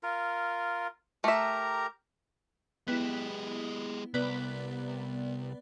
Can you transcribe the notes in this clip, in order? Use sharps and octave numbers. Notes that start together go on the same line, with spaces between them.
F4 A#4
A3 G4 A#4 E5 A#5
G#3 B3 E4 G4
C2 B3 B4 D5